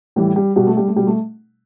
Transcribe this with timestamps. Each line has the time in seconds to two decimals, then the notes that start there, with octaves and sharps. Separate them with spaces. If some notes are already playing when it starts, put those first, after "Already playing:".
0.16 A2 E3 G3
0.36 G3
0.56 B2 G3
0.67 A3
0.77 G3
0.87 A3
0.96 B2 G3
1.07 A3